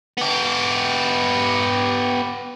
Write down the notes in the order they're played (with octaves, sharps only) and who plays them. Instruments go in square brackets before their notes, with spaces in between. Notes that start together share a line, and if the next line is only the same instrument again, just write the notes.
[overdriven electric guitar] B3 G4